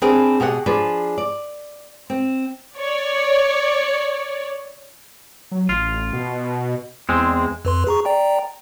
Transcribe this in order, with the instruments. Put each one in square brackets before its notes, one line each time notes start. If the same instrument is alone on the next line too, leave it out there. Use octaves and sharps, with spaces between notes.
[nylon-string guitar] C4 D4 G#4 A#4 B4
B2 G4 G#4 C#5 F#5
F3 D4 G#4 B4 D5
D5
C4
[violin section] C#5 D5
[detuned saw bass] F#3
[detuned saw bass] A1 [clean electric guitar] F4
[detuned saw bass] B2
[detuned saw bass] E2 [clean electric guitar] G#3 C4
[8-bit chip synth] F2 B4 C6
G#4 A#5 C#6
D5 G5 A#5